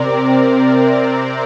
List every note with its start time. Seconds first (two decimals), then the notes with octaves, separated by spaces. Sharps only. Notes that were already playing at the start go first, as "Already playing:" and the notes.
Already playing: C3 C4 A#4 D5